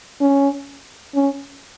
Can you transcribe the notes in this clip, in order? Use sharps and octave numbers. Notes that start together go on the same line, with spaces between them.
C#4
C#4